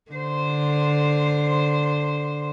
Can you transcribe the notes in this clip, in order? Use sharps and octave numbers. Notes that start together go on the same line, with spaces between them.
D3 C5